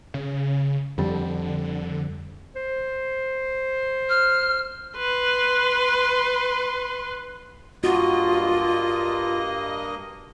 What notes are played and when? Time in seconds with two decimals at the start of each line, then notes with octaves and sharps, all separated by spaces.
0.14 C#3
0.98 F2 D3 G3
2.56 C5
4.09 F6
4.97 B4 C6
7.84 G2 A#3 F4 F#4 D#5